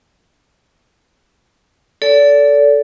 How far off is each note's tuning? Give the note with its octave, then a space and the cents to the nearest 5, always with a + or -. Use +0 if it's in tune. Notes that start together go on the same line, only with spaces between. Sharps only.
A4 +0 D5 -30